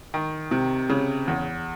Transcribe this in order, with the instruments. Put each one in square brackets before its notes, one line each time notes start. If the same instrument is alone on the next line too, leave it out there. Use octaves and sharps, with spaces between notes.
[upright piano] D#3
C3
C#3
E2